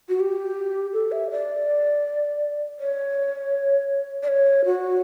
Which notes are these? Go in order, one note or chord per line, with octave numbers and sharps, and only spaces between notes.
F#4
G4
A4
E5
D5
C#5
D5
C#5
F#4